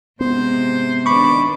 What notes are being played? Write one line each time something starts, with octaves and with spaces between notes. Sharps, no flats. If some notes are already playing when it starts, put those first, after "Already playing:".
G#2 C3 G#3 B3 C5
D#3 D4 B4 B5 C#6 D6